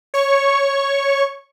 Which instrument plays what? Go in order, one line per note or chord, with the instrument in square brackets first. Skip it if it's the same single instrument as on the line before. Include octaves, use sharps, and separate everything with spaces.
[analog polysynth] C#5 C#6